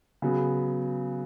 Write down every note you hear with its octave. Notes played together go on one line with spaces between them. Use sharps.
C#3 F#3 B3